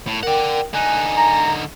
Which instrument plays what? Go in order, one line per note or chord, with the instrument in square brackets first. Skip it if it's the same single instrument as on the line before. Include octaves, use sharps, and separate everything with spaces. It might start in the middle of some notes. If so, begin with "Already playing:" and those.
[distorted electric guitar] A2
[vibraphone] A#4 G5 [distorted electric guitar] D5 F#5
[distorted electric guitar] D3 D#4 [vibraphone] G#5 [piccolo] F#6
[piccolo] A#5